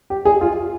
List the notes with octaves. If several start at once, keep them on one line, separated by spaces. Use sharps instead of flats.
G4
G#4
F4